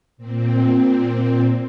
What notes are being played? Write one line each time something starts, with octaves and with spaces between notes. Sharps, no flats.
A#2 C4